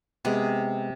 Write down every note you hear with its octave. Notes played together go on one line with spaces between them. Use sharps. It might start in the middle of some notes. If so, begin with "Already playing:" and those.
C3 G#3 B3 G#4